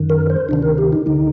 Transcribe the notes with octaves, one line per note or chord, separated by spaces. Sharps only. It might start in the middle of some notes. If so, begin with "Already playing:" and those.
Already playing: F#2 D#3
A#4
C5
D2 C3 D#3 D4
A#4
G4
D#4
D2 D3 D#4